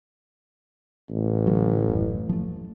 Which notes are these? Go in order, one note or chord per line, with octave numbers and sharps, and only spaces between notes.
A1
D3 E3 F#3
D#1 F#2
F3 A3